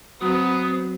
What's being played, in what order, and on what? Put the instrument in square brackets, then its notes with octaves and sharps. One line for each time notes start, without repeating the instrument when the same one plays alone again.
[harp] F#3 [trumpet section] B3 [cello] C4 [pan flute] D#6